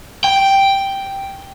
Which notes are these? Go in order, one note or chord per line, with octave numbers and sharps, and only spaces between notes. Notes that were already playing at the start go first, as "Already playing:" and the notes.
G5